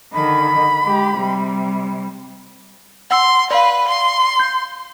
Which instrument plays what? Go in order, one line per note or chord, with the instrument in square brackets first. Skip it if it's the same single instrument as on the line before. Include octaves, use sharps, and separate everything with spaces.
[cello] D3 D#3 [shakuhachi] B5
[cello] G#3 G4
C3 G3
[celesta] F#5 E6 [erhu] C6
[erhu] B4 [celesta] D5 F5
[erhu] C6
[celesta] G6